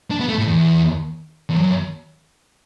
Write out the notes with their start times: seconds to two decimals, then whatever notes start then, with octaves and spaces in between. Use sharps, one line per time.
0.11 D4
0.20 B3
0.29 A3
0.38 A2
0.47 E2
1.49 E2
1.57 F#2